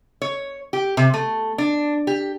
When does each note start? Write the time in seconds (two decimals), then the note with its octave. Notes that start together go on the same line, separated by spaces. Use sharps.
0.22 C#5
0.73 G4
0.97 C3
1.14 A3
1.58 D4
2.07 G4